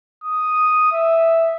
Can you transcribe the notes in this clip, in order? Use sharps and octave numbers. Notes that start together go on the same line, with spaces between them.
D#6
E5